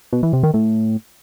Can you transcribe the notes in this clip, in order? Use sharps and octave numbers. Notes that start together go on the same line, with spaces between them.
B2
E3
C3
D#3
A2